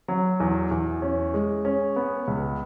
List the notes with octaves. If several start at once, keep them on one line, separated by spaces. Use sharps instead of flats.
F#3
E2
E2
C#4
G#3
C#4
B3
C#2